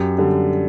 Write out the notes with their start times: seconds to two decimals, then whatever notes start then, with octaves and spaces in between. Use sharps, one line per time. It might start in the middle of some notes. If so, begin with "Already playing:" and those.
Already playing: F#2 G4
0.18 D3 G3